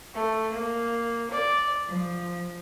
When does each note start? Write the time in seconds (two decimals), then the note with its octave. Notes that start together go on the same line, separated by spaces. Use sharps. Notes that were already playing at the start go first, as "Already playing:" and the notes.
0.15 A3
0.52 A#3
1.32 D5
1.88 F3